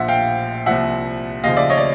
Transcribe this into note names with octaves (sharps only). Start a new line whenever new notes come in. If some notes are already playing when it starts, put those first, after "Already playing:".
Already playing: A#1 A#2 F3 E5 F#5
F5 G5
C2 A#2 F3 E5 F#5
D#2 C#3 F3 D#5 F5
D5 E5
C#5 D#5
D5